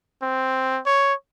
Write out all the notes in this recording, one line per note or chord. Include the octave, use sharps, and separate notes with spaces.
C4
C#5